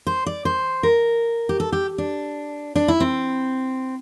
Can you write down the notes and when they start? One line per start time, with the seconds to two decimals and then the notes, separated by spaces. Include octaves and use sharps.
0.07 C5
0.26 D5
0.45 C5
0.83 A#4
1.49 G4
1.60 A4
1.72 G4
1.98 D4
2.76 D4
2.88 E4
3.00 C4